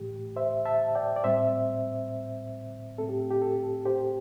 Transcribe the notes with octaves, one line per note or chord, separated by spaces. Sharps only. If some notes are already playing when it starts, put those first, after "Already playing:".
Already playing: A2 E3 A3 G4
C5 E5
E5 A5
D5 G5
D5
A2 G3 C4 C5 E5
A2 A3 C4 A4
G4
G4
A4
G4 C5